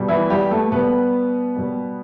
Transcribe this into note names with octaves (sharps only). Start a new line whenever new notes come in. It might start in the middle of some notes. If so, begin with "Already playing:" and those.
Already playing: B2 G3
E3 E4
G3 G4
A3 A4
B2 G3 B3 B4
B2 G3